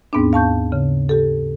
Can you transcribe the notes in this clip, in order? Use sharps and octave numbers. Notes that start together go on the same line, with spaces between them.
D#2 G#2 B3 C4 D4
F5 A5 C#6 G6
C#3
G4 A4